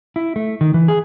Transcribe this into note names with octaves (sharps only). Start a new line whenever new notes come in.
E4
A3
D#3
E3
G#4